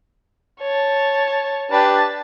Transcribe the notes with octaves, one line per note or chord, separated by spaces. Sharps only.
C#5 A5
D4 G4 B4 A5